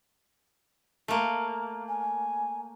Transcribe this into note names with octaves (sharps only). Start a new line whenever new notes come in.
A3 A#3
G#5